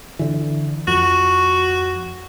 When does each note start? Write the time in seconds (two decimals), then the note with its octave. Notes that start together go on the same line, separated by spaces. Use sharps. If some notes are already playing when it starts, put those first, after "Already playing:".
0.19 D3 E3
0.87 F2 F#4